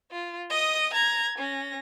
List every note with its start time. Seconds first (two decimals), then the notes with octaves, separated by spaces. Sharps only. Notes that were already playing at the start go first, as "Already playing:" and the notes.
0.11 F4
0.50 D#5 D#6
0.94 A#5 G#6
1.39 C#4 A#6